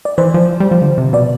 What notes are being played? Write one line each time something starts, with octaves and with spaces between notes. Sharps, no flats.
D5
E3 C5
F3
G3
F3
D3
C3
B2 D5